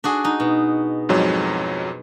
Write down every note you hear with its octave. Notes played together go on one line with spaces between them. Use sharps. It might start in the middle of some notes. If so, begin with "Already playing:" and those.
D4 F#4 G#4
D#4
B2
F2 G#2 F#3